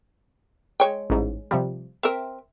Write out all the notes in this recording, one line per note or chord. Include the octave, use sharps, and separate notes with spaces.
G#3 C#5 G5
A1 G#2
C3 F3 G3
C4 A#4 E5